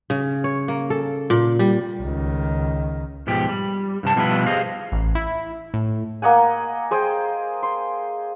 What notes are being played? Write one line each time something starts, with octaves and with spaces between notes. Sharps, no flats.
C#3
C#5
A#3
A4
A#2
G3
C#2 D#3
G#2 B2 F3 G4
G3
G2 C3 A5
B2 F3 G3 D4 E4 B4
G4 G#4 C5 D#5 F5
A1
E4
A2
A#3 D#5 F#5 G#5
G#4 C5 D#5 G5
C6